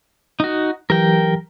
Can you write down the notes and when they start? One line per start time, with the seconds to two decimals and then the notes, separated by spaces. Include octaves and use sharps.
0.40 D#4 F#4
0.90 E3 F#3 G4 A#4 G5